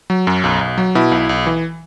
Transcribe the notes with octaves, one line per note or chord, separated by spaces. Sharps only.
F#3
F#2
B1
B1
F#3
B2 E4
B1
B1
E3